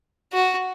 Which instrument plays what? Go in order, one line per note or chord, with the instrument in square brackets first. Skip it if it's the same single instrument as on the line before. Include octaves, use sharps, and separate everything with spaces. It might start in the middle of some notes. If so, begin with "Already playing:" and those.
[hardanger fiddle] F#4